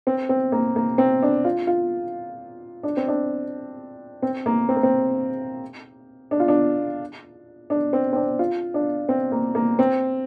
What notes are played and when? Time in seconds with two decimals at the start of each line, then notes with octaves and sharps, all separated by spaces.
0.07 C4
0.29 C4
0.52 A#3
0.76 A#3
0.98 C4
1.22 D4
1.45 F4
1.67 F4
2.83 D4
2.97 C4
3.08 D4
4.22 C4
4.46 A#3
4.69 C4
4.76 A#3
4.83 C4
6.31 D4
6.40 F4
6.48 D4
7.70 D4
7.93 C4
8.13 C4
8.16 D4
8.39 F4
8.74 D4
9.09 C4
9.32 A#3
9.55 A#3
9.79 C4